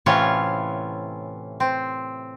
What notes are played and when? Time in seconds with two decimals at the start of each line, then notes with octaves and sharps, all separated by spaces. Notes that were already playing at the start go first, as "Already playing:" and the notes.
0.06 A2 C3 E3 C#4 F4 C#5
1.60 C4